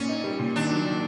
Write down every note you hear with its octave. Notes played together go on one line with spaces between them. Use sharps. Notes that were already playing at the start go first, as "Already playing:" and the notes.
Already playing: A#2 C#4
D#4
G3
A#2
D#3 D4
F#3
D#3